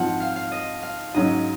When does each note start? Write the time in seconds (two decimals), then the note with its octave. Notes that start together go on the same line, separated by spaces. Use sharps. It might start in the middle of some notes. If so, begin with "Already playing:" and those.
Already playing: G#2 F3 C4 F4 F#5
0.20 F5
0.36 F5
0.52 D#5
0.83 F5
1.14 G#2 F#3 C#4 D#5